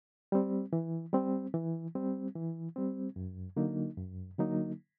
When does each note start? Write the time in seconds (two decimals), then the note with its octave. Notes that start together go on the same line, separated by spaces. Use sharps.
0.32 G3 C4
0.73 E3
1.13 G3 C4
1.54 E3
1.95 G3 C4
2.35 E3
2.76 G3 C4
3.16 F#2
3.57 D3 F#3 A#3 D#4
3.97 F#2
4.39 D3 F#3 A#3 D#4